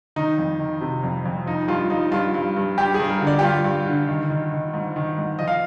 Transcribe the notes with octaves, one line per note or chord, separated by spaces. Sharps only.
D#3 D#4
F2
D#3
C3
F2
F2
F3 D#4
G2 F4
F3 D#4
G2 F4
G2
G2
G2 G4
G#4
G2
A#4
D3
D5
G4
G2 F4
G2
D3
D#3
D#3
D#3
G#2
D#3
G#2
F3 D#5
F5